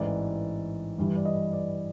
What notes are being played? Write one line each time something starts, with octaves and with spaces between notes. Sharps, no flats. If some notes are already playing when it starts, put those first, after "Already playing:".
Already playing: A1 G#2 E3 D5
G2 E3 G3
D5
D#5
D5